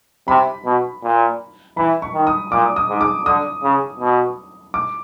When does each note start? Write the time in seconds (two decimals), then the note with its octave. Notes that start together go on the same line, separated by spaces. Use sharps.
0.28 C3 B5
0.65 B2
1.03 A#2
1.77 E3 B5
2.02 C#6
2.14 D#3
2.27 D#6
2.52 A#2 D6
2.76 D#6
2.89 G#2
3.01 D6
3.25 D3 D#6
3.63 C#3
4.00 B2
4.74 D6